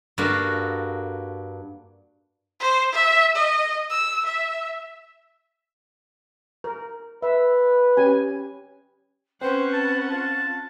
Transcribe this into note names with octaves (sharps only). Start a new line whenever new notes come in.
G2 A#3 F#4 A4 F5
C5
E5
D#5
E6
E5
A#4
B4 E5
C#4 G4 G#5
C4 C#4 B4 C5 F#5
A5
F4 A5